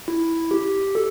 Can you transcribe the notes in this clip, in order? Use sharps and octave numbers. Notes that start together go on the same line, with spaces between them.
E4
G4
A4